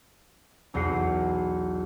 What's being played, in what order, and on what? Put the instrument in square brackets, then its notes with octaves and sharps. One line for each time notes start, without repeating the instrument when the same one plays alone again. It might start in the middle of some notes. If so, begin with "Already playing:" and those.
[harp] B1 E2 D#5 F#5 C7